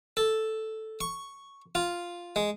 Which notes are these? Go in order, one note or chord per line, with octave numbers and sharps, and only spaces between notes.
A4
C#6
F4
G#3